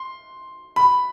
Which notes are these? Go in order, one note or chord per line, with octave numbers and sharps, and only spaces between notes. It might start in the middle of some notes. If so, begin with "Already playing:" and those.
Already playing: C6
B5